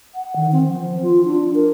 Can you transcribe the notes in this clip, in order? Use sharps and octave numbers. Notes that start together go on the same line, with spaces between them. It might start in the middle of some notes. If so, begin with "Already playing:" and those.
F#5
D#3
C4
F3
F4
D4
A#4